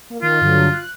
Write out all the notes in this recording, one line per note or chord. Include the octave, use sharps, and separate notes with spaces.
A#3
D#3 F4
G2 D3 F#3
F#6